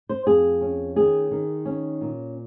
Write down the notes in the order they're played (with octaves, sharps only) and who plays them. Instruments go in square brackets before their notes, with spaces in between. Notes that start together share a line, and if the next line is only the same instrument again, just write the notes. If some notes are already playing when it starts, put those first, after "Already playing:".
[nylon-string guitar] C5
F2 G#4
C#4
D#3 G#4
D#3
C#4
A#2